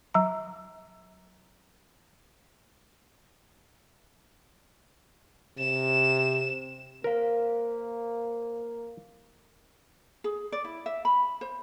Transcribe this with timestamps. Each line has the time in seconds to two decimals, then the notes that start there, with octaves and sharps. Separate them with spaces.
0.14 F#3 A#5
5.59 C3 E7
7.04 A#3 A#4 C5 F5
10.24 G#4
10.52 D5
10.65 E4
10.86 E5
11.05 B5
11.41 C5